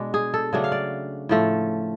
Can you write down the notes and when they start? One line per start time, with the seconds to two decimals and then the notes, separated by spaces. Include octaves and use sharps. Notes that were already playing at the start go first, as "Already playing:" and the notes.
Already playing: B2 G#3 D4
0.14 G#4
0.34 A4
0.53 C#3 F#3 A3 D4
0.64 F5
0.72 D5
1.29 A2 F3 A3